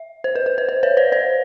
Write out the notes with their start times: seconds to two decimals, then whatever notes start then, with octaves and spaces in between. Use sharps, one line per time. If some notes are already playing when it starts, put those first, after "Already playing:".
Already playing: E5
0.24 C5
0.35 B4
0.46 B4
0.58 C5
0.69 C5
0.83 B4 C#5
0.97 C5 D5
1.12 C5 D5